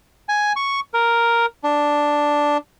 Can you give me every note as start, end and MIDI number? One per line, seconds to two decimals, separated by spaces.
0.29 0.53 80
0.56 0.80 85
0.94 1.46 70
1.64 2.57 62